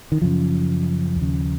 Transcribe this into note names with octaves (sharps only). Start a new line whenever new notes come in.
D#3
F#2 C#3 F3
D#2 C#3